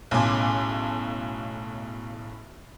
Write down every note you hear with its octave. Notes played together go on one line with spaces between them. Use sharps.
B1 A2 C#3 G#5 C6 D6